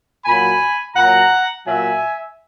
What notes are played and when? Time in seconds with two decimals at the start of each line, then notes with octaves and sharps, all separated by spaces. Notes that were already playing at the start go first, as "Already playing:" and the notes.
0.25 A#2 F#3 G#5 B5
0.95 A#2 F#3 F#5 A#5
1.66 A#2 F#3 E5 G#5